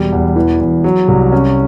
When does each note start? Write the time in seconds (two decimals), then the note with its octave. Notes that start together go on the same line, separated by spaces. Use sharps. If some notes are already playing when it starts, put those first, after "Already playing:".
Already playing: E1 G3
0.12 E2
0.36 E3
0.60 E2
0.84 F#3
1.08 C2
1.32 C#4